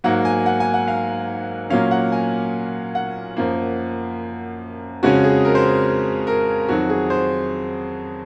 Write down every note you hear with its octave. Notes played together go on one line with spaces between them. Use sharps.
G#2 F#3 A#3 F#5
G#5
F#5
G#5
F#5
F5
A#2 F#3 A#3 C#4 F5
F#5
G#5
F#5
F#2 F3 A#3
F2 C#3 G#3 C#4 F#4
G#4
A#4
C5
A#4
A#4
F2 D#3 F#3 F#4
G#4
C5